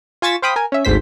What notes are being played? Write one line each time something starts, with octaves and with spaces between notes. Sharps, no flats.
F4 G#5 C#6 A6 B6 E7
C5 F5 G5 B5 D#6 B6
A#4 G#5
C#4 E5
G#1 D2 G#2 C5 B6